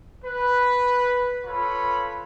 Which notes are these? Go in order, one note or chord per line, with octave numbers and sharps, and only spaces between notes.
B4
F4 A4 B4 C#5 B5